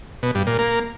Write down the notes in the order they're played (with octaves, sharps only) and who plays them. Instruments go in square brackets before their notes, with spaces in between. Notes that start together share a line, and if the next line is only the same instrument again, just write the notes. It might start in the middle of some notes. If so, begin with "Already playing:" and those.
[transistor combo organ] B2
G2
A#2
A#3